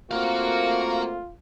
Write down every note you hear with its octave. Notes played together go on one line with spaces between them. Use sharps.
A3 A#3 C4 F4 F#4 A#4 F5